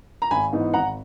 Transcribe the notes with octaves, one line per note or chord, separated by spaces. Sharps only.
A#5
G#1 G#5 B5
G#2 E3 B3 D#4
G#1 F#5 A#5